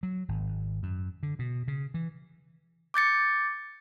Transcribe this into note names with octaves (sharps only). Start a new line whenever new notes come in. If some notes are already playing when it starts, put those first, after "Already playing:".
F#3
G#1
F#2
D3
B2
C#3
E3
D6 G6 A6 C#7